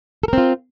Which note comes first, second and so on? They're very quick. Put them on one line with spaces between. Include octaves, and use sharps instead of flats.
A4 A#4 C4 F4